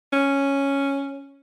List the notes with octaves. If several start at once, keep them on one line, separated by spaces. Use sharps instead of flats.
C#4